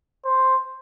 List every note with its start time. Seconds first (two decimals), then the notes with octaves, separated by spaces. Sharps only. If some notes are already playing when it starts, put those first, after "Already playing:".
0.25 C5